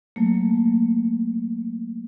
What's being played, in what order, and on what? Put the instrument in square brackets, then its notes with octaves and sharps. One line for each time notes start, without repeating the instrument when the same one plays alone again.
[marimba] F#3 A3 A#3